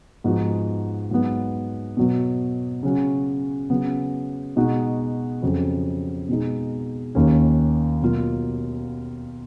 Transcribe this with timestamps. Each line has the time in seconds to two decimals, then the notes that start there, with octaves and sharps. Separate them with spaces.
0.24 G#2 F3 B3 D#4 F#4
1.11 G#2 F#3 B3
1.97 B2 F#3 B3
2.83 C#3 F#3 C#4 F#4
3.70 C#3 F#3 B3
4.56 B2 G#3 D#4 F#4
5.42 F2 C#3 F#3
6.29 B2 G#3 D#4
7.15 D#2 D#3 A#3 C#4
8.02 B2 F#3 A#3 F4